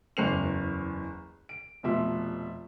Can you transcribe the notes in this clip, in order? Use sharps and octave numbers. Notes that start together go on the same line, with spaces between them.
F#1 E2 C5 C7 C#7 F7
D7
F1 B2 F3 E5 C6